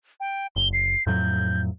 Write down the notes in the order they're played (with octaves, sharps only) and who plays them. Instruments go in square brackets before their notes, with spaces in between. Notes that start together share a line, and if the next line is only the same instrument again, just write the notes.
[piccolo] G5
[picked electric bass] F#1 [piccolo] G7
[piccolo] C7
[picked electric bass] F2 A2 F#3 [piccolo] G6